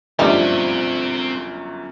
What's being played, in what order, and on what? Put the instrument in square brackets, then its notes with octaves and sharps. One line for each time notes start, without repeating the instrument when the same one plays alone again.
[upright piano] G1 F#2 F3 [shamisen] G3 A3 D#4 [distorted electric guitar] C4 E5